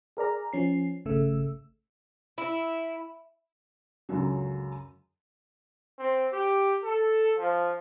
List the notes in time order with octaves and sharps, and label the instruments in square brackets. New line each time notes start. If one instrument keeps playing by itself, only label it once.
[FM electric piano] G#4 A#4 D5 A#5
F3 C#4 C7
G#1 C#3 A3 E6
[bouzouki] E4
[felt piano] C#2 F#2 D3 F#3
[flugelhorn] C4
G4
A4
F3